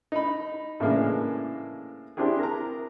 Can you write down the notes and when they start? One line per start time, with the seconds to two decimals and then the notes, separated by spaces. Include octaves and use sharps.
0.12 D#4 B5
0.80 A2 C#3 E3 G#3 A#3 D4
2.17 C4 D4 E4 G4 G#4
2.39 A#4 A#5